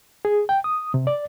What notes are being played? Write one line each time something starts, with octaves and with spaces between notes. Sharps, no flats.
G#4
G5
D#6
C3
D5